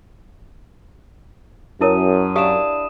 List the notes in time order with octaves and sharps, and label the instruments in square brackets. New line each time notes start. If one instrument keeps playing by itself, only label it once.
[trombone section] F#2 [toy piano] E4 A#4 C#5 [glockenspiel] A5 D#6 D#7
[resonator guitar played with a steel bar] D4 E4 [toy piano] G4 F5 [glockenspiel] D#6 E7